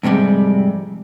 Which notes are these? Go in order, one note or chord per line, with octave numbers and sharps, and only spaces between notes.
F2 G#2 C3 G3